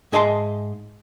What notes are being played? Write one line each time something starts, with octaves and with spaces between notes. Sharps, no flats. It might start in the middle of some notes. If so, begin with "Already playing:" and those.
G#2 G#4 D#5 E5 A5 C6